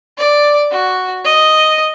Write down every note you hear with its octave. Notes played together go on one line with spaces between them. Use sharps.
D5
F#4
D#5